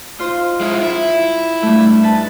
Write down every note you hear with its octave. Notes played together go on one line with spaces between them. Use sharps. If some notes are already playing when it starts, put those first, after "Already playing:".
D#4 F4 C5
G#3 E4
E4
G2 A3
D#4 B4 A5